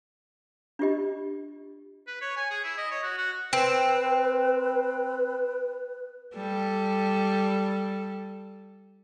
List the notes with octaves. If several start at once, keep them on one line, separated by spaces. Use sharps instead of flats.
D4 F4 G4 D#5
B4
C#5
G#5
G#4
E4
D#5
C#5
F#4
F#4
C4 B4
G3 A4